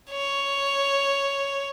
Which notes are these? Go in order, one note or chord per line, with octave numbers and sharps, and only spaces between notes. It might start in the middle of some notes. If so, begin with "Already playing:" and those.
C#5